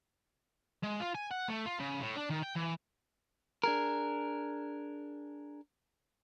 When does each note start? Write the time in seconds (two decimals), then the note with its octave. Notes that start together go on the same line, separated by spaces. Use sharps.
0.83 G#3
1.00 F4
1.15 G#5
1.31 F#5
1.48 A3
1.66 F4
1.80 C#3
2.00 A2
2.17 D4
2.30 D#3
2.43 G5
2.56 E3
3.64 D4 G#4 A#4